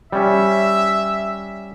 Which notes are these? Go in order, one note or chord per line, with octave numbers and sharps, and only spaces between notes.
G3 C#4 E5